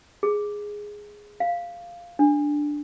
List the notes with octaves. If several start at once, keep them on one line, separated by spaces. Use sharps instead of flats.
G#4
F5
D4